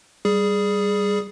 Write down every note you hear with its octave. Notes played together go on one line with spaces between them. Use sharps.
G3 G#4